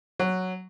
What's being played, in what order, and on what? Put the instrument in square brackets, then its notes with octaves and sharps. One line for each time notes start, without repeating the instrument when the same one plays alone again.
[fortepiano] F#3